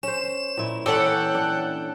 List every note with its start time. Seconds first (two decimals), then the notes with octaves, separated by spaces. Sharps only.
0.03 C#4 C5 E7
0.57 A#2 E4
0.86 E3 C#4 A4 D5 F#5 G5
1.35 D4